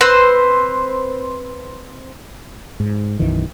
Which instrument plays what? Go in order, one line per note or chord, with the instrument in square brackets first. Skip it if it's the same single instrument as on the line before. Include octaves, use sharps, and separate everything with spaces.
[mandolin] C4 B4 C5
[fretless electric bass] G#2
B1 F#2 D#3 E3